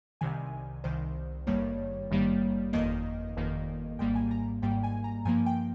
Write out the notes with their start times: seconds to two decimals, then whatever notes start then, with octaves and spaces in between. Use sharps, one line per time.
0.21 C2 C3 D#3 G#5
0.84 C2 C3 D#3 C5
1.47 G#1 G2 D#3 G3 A#3 C#5
2.10 G#1 G2 D#3 G3 A#3
2.73 G1 F2 D#3 A#3 D#5
3.36 G1 F2 D#3 A#3
3.99 G#1 G#2 G3 A#3 G5
4.15 G#5
4.31 A#5
4.62 G#1 G#2 G3 A#3 G5
4.83 G#5
5.04 A#5
5.25 G2 F3 A#3 G#5
5.46 G5